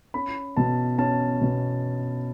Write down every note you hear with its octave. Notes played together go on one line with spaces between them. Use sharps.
C#4 B5
B2 A5
C#4 A5
B2